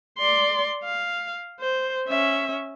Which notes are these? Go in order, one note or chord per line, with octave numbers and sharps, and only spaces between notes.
D5 C6
F5
C5
C#4 E5